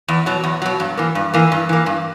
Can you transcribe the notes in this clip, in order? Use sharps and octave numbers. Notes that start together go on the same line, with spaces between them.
E2
B2 F#3
E2
B2 F#3
G2
E3 A#3
G2
E3 A#3
G2
E3 A#3
G2